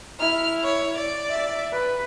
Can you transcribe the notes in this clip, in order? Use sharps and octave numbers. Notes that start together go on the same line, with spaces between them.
E4 F6
C#5
D5
E5
B4